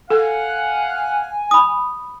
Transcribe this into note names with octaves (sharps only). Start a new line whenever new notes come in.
A4 F5 F#5 G#5
B5 D#6